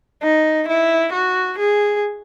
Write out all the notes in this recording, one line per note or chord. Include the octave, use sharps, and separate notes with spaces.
D#4
E4
F#4
G#4